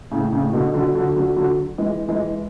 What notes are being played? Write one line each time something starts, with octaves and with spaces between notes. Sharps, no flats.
A2 C#3
A2 C#3
B2 D3
D3 F#3
D3 F#3
D3 F#3
D3 F#3
E3 G#3
E3 G#3